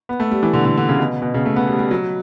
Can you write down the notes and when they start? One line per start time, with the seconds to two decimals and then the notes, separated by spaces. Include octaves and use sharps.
0.09 B3
0.20 A3
0.31 G3
0.43 E3
0.53 D3
0.65 D3
0.77 D3
0.89 C#3
0.99 B2
1.22 B2
1.34 C#3
1.46 A3
1.56 B3
1.68 G3
1.79 G3
1.91 F#3